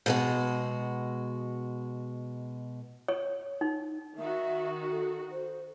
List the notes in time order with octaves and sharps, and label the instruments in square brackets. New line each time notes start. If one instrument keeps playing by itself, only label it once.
[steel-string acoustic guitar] B2 G#3 F#4
[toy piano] C#5
D#4
[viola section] D#3 F#4 [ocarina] E5
[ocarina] A4
C5